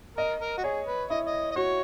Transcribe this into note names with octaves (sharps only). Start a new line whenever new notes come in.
A#4 D#5
A#4
F#4
G#4 C#5
B4
E4 D#5
D#5
D#5
F#4 C#5